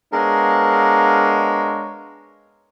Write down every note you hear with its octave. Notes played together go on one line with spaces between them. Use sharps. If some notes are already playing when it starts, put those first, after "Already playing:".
G#3 B3 D4 A#4 C#5 F5